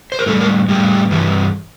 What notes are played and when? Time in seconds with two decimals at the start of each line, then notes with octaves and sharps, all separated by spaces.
0.12 C5
0.19 A#4
0.26 A2 G3 A4
0.41 A#4
0.68 A2 G3
1.11 G2 E3 G3